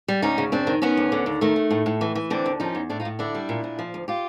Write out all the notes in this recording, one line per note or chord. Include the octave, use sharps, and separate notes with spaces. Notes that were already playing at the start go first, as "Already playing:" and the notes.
G3
D2 C#4 D#4
C#3
F#2 C4 D4
D#3
D#3 B3 C#4
D2
D3
D#2
D#3 A3
D#3
A2
A2
E3
E3
D3 C4 D4
D#2
F3 C#4 D#4
E2
A2 D4 E4
D#4 F4
A2
D3 D4 E4
G3
A#2
A#2
F3
D2
F4 G4